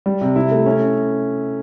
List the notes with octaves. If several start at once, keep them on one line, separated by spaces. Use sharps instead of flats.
G3
C3
E4
A3
C#4